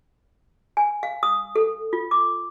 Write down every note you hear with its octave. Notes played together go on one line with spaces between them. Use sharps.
G#5
F5
D#6
A4
F4
D6